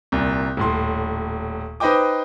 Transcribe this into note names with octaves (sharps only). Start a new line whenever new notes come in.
C2 A#2
D#1 A2 C6
D#4 B4 C5 D#5 G5 D6